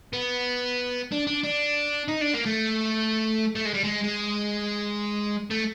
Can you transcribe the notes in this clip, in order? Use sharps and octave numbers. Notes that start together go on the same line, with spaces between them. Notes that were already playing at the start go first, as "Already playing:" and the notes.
B3
D4
D4
D4
D#4
D4
A#3
A3
A3
G#3
G3
G#3
G#3
A3